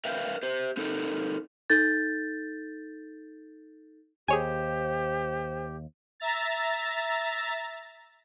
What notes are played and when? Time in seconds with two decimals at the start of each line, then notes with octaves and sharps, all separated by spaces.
0.05 A#4 B4 E5 F5 G5
0.43 G4 C5
0.77 C4 D#4 A4 A#4
1.70 D#4 A4 G6 A6
4.28 D#2 G4 G#4 C5 C#5 G#5
6.20 E5 A#5 A6